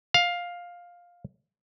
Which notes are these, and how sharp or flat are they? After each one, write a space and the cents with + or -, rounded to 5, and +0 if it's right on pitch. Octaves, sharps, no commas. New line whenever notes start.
F5 +10